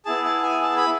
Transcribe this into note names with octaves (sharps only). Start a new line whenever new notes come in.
B3 E4 G#4 A5
A5
G#5
A5
B5